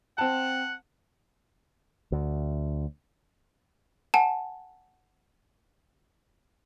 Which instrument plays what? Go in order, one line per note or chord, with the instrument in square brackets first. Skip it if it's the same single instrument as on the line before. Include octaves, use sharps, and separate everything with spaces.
[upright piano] C4 A5 [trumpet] F#5
[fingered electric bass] D2
[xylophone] F#5 G#5 A5